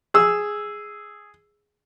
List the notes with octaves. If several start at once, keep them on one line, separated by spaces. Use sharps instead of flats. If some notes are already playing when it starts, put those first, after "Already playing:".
G#4 E6